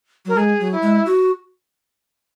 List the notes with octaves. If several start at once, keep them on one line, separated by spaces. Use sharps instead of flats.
F#3 A#4
G#3 G#4
F#3
E4
G#3
F#4